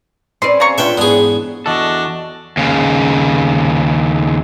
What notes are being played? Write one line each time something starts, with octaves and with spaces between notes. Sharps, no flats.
C4 C#4 B4 D5 C6
C#3 A#5 C#6
B3 D4 F4 E5 G5
E2 G#2 B3 D4 G#4
E2 D4 F#4 A4 D#5
D#2 C#3